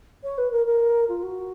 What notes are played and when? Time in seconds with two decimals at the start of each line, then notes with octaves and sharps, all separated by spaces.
0.24 C#5
0.38 B4
0.51 A#4
0.67 A#4
1.09 F4
1.23 F#4